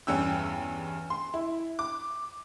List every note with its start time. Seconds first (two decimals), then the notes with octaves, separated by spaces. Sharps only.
0.07 E2 G2 C#4 G5 E6
1.10 C6
1.34 E4
1.79 D6